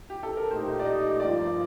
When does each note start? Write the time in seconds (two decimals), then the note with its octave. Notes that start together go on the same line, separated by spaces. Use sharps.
0.10 G4
0.23 A4
0.37 A#4
0.50 A#2 A3 D#4 G4 C5
0.80 D5
0.85 D#5
1.20 G2 F3 A#3 F4 D5